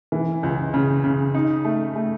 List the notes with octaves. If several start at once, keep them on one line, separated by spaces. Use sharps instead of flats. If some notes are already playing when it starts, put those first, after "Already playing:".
E3
C#2
C#3
C#3
D#4
A3
A3